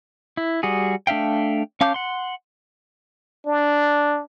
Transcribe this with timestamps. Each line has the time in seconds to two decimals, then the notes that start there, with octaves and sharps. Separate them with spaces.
0.37 E4
0.63 G3 F#4 G#4
1.07 A3 D4 E5 F5 G5
1.81 C#4 F5 A5 D6 G6
1.94 F#5 C6
3.46 D4